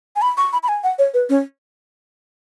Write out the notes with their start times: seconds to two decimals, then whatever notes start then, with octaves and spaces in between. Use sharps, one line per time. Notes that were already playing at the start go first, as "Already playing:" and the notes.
0.16 G#5
0.22 B5
0.37 C#6
0.53 B5
0.63 B5
0.68 G#5
0.84 F#5
0.99 C#5
1.14 B4
1.29 C#4